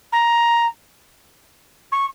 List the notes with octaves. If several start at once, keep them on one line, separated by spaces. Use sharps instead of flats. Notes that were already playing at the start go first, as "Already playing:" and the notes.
A#5
C#6